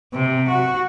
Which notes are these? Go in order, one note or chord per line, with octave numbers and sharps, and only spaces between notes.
C3
F#4